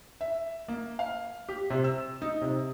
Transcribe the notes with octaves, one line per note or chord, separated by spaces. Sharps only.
E5
A#3
F5
G4
C3
E6
D#4
C3